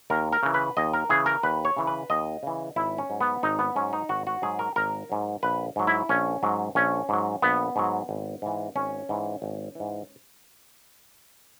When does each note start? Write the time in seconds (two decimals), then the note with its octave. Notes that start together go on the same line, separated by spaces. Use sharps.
0.10 D#2 A#4
0.32 A#4
0.43 C#3 E3
0.54 B4
0.77 D#2 D#5
0.94 A#4
1.10 C#3 E3 G#4
1.26 A#4
1.43 D#2 B4
1.65 C#5
1.77 C#3 E3
1.87 B4
2.10 D#2 D#5
2.43 C#3 E3
2.76 G#1 E4
2.98 C#4
3.10 G#2 F#3
3.21 B3
3.43 G#1 D#4
3.59 B3
3.76 G#2 F#3 C#4
3.93 D#4
4.09 G#1 F#4
4.27 F#4
4.42 G#2 F#3 G#4
4.59 A#4
4.76 G#1 A#4
5.10 G#2 F#3
5.43 A#1 B4
5.76 G#2 F#3
5.87 E4
6.09 A#1 C#4
6.43 G#2 F#3
6.75 A#1 C#4
7.09 G#2 F#3
7.42 A#1 B3
7.76 G#2 F#3
8.09 G#1
8.42 G#2 E3
8.75 G#1 C#4
9.09 G#2 E3
9.42 G#1
9.75 G#2 E3